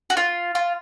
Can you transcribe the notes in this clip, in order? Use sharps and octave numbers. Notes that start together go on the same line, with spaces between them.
F#4
F4
F4